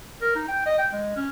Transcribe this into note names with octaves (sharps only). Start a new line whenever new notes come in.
A#4
D#4
G5
D#5
G5
G#3
C#4